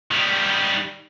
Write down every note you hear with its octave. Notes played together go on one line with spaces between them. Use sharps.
D#3 G3